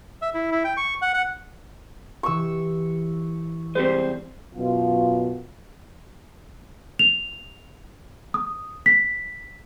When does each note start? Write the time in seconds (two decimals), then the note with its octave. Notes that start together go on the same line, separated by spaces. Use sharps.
0.22 E5
0.34 E4
0.52 E4
0.64 G5
0.77 C#6
1.02 F#5
1.14 F#5
2.23 E3 G4 C#6 E6
3.75 C3 G3 G#3 C5
4.55 F#2 B2 F4
6.99 F7
8.34 D#6
8.86 B6